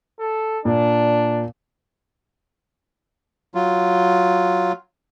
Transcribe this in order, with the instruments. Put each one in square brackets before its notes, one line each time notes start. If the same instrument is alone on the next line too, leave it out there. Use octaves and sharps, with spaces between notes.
[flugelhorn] A4
[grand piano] A#2 [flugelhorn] D4
[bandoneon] F#3 F4